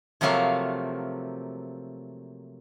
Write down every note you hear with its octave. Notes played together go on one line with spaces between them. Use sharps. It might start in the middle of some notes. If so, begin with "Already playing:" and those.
C3 F3 F#3 A3 A#3 F5